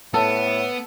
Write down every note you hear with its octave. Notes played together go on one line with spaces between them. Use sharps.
A2 B3 A4